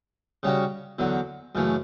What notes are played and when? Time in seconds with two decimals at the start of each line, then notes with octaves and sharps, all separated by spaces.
0.43 C#3 G3 C#4 F#4
0.99 E2 D3 F#3
1.55 F#2 C#3 E3 A3